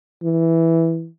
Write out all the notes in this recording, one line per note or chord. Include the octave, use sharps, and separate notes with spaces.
E3